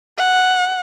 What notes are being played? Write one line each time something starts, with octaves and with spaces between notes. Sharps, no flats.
F#5